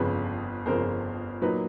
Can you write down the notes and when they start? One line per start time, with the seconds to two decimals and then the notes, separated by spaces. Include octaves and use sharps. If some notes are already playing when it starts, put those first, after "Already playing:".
Already playing: G1 F2 C#3 B4
0.66 G1 F2 C#3 A#4 C5
1.42 A#2 F#3 A#3 D#4 B4